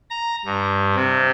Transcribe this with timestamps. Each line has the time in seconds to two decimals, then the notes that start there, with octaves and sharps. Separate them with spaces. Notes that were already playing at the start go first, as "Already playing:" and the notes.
0.10 A#5
0.45 G2
0.96 C3